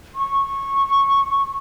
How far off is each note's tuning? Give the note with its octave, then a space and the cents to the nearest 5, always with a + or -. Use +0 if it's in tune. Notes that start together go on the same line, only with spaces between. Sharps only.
C#6 -15